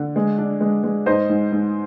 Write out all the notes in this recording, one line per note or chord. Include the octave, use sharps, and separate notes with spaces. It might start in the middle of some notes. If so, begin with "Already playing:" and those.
Already playing: D3
G#3
D4
G#3
G#3
G#2 C5 D#5
G#2
G#2